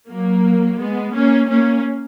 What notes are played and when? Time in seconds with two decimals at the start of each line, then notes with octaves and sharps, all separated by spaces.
0.09 F#3 A#3
0.80 G#3 B3
1.14 A#3 C#4
1.49 A#3 C#4